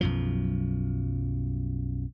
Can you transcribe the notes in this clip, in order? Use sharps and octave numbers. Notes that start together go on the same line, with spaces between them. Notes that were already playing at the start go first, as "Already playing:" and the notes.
B1 F#2 F3